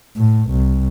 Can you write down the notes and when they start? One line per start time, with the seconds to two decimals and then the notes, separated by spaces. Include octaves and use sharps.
0.17 A2
0.50 C2